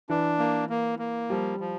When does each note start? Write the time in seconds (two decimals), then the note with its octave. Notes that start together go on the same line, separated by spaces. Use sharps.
0.09 E3 D4
0.39 A#3
0.70 A#3
0.99 A#3
1.30 F3 G3
1.60 F3